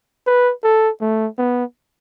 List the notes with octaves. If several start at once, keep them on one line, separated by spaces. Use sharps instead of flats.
B4
A4
A3
B3